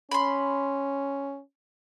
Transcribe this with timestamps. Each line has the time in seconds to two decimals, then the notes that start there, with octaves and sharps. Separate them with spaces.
0.11 C#4 B5 C6